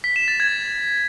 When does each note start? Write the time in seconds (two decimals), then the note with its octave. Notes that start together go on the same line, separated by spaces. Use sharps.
0.04 B6
0.16 E7
0.28 A6
0.40 G#6